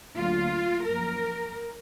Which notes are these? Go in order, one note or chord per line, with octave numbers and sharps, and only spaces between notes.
D2 D3 F#3 A#3 F4
F#2 F3 A#3 A#4